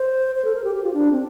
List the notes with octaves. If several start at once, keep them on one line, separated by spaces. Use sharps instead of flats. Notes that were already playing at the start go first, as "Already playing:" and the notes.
Already playing: C5
C5
A4
A#4
G4
G4
F4
D4
C4